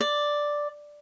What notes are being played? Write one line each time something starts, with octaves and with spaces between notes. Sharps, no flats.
D5